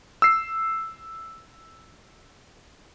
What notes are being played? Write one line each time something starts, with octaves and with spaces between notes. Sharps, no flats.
E6 C7